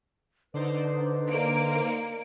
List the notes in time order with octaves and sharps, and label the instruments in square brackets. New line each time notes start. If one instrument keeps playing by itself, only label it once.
[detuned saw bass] D3 [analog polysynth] D#4 C5 D5 [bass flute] B4
[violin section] A#3 D7